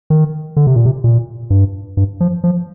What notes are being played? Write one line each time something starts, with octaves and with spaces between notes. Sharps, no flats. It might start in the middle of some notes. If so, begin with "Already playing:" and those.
D#3
D3
C3
A#2
C3
A#2
G2
G2
F3
F3